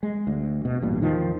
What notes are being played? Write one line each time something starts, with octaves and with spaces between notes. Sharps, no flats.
G#3
D2
B2
A1 G2 A#2
E2 D#3 F3